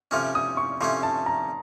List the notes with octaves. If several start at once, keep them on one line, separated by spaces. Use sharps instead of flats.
C3 F3 A3 C#4 F6
D#6
C#6
C3 F3 A3 C#4 C6
A5
A#5